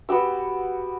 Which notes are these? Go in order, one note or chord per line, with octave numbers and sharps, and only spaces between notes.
B3 F#4 G4 E6